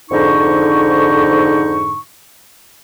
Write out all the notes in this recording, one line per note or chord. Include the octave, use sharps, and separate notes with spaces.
F2 G#2 D3 D#4 C#6